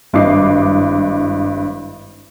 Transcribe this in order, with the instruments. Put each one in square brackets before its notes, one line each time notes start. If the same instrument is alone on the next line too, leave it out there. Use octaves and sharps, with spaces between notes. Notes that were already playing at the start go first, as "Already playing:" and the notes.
[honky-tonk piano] G#1 G2 E4 D#5 D6 C7